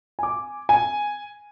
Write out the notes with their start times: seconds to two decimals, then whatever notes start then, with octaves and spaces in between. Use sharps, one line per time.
0.19 G#5 D6
0.69 G#5